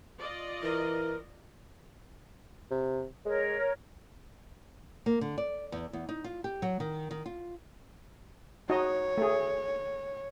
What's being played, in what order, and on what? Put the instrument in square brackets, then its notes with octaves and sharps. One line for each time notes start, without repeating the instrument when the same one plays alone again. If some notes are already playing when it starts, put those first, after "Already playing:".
[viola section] F4 D5 D#5
[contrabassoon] E3 [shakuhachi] A#4
[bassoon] C3
[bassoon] G#3 [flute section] A#4 C#5
[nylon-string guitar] A#3
D3
D5
E2
E2
D#4
F4
G4
F#3
D#3
D#3
F4
[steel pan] D#4 F#4 D#5 [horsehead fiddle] C#5
[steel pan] A3 G#4